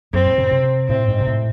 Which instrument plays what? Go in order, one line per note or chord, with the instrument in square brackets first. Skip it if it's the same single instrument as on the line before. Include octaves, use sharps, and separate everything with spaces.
[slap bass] F#2 [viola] C4
[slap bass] A2
C#3
C3
[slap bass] A2 [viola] C4
[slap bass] G#2
C3
A2